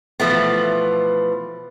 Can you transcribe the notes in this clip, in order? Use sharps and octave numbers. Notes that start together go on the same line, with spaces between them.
B2 E3 F3 A3 B3